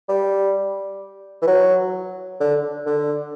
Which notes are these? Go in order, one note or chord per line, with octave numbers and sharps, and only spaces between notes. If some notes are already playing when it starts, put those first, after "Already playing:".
G3
E3
F#3
D3
D3